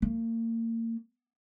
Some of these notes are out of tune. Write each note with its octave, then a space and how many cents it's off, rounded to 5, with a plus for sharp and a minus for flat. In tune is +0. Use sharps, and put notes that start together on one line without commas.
A#3 -35